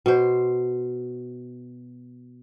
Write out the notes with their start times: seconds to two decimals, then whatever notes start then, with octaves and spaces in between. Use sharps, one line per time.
0.06 B2 C5